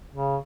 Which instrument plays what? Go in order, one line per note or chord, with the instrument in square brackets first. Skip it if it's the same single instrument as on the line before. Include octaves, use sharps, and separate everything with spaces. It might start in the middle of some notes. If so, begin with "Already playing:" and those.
[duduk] C#3